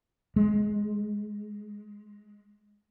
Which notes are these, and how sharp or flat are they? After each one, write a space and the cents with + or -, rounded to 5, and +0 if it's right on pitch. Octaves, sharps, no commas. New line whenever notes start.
G#3 +10